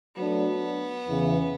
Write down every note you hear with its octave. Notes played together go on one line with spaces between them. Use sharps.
F#3 A3 B3 D4
E2 C#3 E3